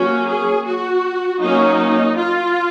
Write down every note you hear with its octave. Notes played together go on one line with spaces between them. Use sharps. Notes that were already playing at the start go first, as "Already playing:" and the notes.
Already playing: F#3 A#3 C#4 F#4
G#4
F#4
F#3 A#3 C#4 D#4
F4